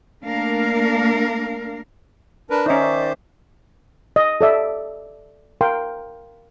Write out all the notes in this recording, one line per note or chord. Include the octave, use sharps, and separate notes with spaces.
A3 A#3 D4 A#4 F5
D4 A#4 B4
D#3 C#4 D#4 C5 D5 E5 D6
D#5
A4 D5 E5
A#4 F5 G5 C6